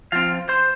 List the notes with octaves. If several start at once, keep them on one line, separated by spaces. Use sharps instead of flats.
F3 C4 F4 F5
C5 C6